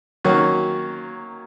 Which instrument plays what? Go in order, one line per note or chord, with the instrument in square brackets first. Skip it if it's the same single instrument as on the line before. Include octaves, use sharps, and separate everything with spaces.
[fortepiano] D#3 F#3 A#3 C#4